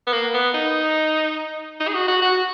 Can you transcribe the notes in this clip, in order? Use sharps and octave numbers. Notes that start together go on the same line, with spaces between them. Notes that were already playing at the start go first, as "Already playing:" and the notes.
B3
A#3
B3
D#4
D#4
G#4
F#4
F#4
F#4